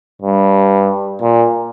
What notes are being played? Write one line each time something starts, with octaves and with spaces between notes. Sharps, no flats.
G2
A#2